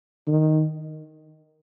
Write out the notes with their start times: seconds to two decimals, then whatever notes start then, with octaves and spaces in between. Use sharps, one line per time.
0.27 D#3